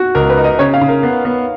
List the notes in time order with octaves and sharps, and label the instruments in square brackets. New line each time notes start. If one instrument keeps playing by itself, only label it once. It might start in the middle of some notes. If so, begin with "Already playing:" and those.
Already playing: [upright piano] F#4
[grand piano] C#2 [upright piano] A#4
[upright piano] B4
[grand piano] D#4
[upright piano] D#5
[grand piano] C#3 [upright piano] C#5
[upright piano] F5
[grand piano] C#3
[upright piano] A#4
[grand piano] B3
B3